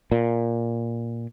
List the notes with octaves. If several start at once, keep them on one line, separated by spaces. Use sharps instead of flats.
A#2